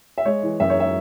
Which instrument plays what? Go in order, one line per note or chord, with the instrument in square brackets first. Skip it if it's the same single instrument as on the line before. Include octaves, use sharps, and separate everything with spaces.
[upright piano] E5
G#3 C#5
E3
F#2 E5
C#5
E5